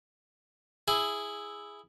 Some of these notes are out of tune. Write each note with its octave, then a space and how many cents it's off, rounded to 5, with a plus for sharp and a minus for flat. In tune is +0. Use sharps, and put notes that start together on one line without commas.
E4 +0 G#4 +0